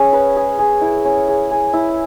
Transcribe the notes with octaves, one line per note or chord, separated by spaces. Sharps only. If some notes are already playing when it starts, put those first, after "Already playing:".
Already playing: C#4 G#4 E5
B4
G#4
G#4
E4
C#4
G#4
G#4
E4